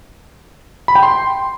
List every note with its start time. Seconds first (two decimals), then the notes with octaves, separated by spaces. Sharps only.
0.88 B5
0.95 G5
1.03 C6